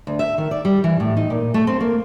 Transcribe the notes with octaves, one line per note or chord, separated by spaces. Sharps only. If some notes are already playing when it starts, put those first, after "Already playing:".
D2
E5
D#3
D5
G3
E3
A2
D#4
A#2
A3
C4
A#3